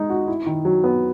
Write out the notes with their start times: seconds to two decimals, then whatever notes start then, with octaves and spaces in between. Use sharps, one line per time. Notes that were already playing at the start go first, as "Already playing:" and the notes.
Already playing: G#3 D#4
0.10 F#4
0.28 E4
0.46 D#3
0.65 F#3
0.84 B3